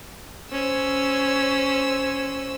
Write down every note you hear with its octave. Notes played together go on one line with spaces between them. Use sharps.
C#4 C5 E6